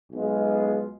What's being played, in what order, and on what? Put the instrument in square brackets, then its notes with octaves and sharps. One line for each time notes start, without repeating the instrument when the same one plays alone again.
[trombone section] B1 B2 G#3 B3 F4